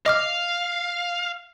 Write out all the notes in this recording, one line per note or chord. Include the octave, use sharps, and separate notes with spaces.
D#5 F5 D6 F6